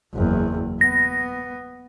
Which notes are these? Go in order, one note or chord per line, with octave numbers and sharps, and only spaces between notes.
F#1 E2
B3 A#6